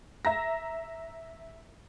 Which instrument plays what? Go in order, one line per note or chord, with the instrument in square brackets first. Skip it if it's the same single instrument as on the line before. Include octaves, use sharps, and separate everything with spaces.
[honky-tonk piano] E5 A#5 A#6